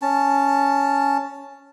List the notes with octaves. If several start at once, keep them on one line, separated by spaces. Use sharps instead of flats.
C#4 A5